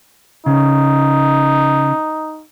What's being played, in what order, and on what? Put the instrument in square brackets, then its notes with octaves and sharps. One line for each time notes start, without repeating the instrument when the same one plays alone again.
[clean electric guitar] C#3 [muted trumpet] D#4